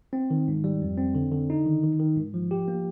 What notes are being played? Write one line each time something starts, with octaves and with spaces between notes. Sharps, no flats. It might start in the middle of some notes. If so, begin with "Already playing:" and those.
C4
D#3
G#2
G3
F2
C4
D3
D3
D#4
D#3
D#3
D#3
G#2
F3
G4
A#3